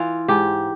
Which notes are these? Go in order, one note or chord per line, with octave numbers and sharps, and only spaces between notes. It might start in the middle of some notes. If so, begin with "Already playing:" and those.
Already playing: E3 F4
G#2 G4